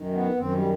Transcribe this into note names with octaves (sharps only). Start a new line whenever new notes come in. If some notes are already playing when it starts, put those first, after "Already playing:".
Already playing: F#2 D#3
B3
F#2 D#3 C4
G3